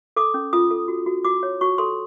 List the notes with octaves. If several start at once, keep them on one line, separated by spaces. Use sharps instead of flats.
A4 D6
C#4
F4 D#6
A4
F#4
F#4
F#4 D6
C#5
F#4 C#6
A4 C6